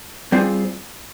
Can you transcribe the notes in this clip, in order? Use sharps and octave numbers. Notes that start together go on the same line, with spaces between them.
G3 C4 F4 G#4